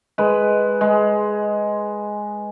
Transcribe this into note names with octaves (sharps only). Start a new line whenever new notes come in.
G#3 B4
G#3